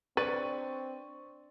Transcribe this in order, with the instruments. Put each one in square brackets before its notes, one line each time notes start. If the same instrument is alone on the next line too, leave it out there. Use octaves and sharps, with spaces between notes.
[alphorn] C4 [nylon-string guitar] D4 D5 [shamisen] B4 [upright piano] C#6 A6 D#7